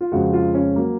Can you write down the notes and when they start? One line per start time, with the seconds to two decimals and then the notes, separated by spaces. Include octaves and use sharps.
0.01 F4
0.12 F2 C#3 G#3 F#4
0.33 F4
0.54 C#4
0.76 F#3 A#3